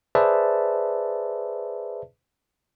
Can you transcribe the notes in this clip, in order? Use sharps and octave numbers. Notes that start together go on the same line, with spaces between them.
G#4 B4 C5 D5 E5 A5